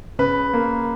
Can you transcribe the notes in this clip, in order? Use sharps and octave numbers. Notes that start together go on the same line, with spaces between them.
C#3 B4
A#3